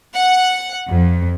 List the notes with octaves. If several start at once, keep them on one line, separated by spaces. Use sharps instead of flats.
F#5
F2